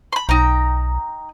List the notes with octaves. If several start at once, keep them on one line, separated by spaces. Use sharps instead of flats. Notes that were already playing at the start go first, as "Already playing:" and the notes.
B5 C6
B1 D#4 G5 A#5